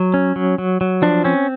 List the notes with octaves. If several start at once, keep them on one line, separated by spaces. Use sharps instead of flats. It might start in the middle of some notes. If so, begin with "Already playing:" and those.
Already playing: F#3
C#4
F#3
F#3
F#3
F3 D4
C4 C#4